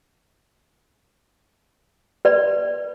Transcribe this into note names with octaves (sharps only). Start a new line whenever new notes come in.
B4 D5